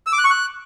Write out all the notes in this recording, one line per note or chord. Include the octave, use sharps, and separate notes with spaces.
E6
D6
F#6
C#6
F#6